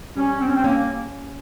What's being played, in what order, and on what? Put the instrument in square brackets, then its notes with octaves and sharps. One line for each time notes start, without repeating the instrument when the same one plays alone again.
[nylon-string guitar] G3 [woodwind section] C#4
[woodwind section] C4
C#4
C4
[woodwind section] A#3 [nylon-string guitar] C#4